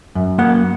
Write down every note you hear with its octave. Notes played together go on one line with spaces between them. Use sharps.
F#2
A#3 F#5